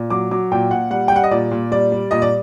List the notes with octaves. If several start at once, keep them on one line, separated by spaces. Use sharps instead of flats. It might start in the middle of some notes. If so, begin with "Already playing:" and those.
Already playing: A#2
F#3 D6
F#3 D6
A#2 G5
A#2 F#5
G3 F#5
G5
G3 F#5
D#5
A#2 D5
A#2
G3 D5
G3
A#2 D#5
D5